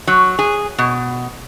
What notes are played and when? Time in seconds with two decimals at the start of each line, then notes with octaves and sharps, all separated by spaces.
0.07 F#3
0.39 G#4
0.78 B2